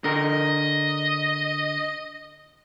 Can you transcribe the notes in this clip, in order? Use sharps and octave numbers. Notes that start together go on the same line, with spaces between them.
D3 A#4 D#5